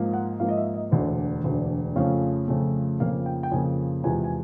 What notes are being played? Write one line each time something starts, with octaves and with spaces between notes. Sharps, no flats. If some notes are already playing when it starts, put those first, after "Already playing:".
Already playing: G#2 F3 A#3
F#5
G#2 F3 A#3 F5
D#5
E5
D#5
E1 D2 D3
E1 D2 D3
F2 C#3 F3 A3 C#4 F5
F2 C#3 F3 A3 C#4
F2 C#3 F3 A#3 F5
G5
G5
F2 C#3 F3 A#3 G#5
E2 C3 F3 G#3 G#5
G#5